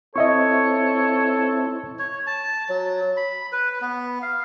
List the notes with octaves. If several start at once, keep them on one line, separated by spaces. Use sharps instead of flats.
C4 E4 A4 C#5 D#5 E5 C#6
C#5
A5
F#3
B5
B4
B3
F5